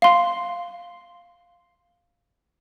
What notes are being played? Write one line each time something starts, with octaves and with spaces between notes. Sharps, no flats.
F5 C6